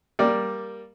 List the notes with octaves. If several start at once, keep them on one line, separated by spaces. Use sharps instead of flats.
G3 A#3 D5